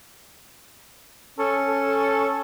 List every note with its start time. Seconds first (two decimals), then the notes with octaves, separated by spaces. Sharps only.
1.39 C#4 A4
1.68 A4